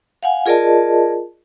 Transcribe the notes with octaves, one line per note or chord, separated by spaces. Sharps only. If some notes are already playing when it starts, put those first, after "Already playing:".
F5 F#5 G#5
F4 G#4 A#4 D5 D#5 A5